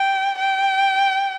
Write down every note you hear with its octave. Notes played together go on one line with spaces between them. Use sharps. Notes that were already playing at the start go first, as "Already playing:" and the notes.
Already playing: G5
G5